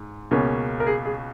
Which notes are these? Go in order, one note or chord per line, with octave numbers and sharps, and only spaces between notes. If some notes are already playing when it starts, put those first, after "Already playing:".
Already playing: G#2
C#2 B2 A#3 C#4
A#4
G#4
G#4